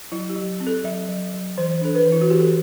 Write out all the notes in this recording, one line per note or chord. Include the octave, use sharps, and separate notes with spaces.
F#3 E4
G4
F#3
C4
A4
F#3 E5
F#3
F#3
E3 C5
D4 A4
B4
E3
E4
F#4
E3 G4
A4